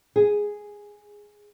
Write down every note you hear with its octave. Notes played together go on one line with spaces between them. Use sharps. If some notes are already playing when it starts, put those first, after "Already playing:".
G#4